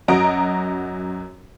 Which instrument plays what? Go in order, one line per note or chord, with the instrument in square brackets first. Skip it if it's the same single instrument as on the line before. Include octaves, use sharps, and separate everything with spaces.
[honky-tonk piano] F#2 F#4 D#5 A#5 D7